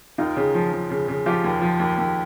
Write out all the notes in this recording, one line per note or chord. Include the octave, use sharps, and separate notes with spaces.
D#2 D#4 F4
C#3
F3
F3
C#3
C#3
F3 F4 G4
D#2
F3
D#2
D#2